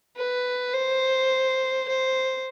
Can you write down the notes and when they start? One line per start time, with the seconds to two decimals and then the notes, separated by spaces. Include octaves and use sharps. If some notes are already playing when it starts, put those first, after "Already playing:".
0.17 B4
0.74 C5
1.88 C5